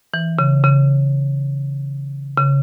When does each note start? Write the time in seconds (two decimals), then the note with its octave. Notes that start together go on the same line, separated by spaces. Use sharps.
0.14 E3
0.39 C#3
0.64 C#3
2.37 C#3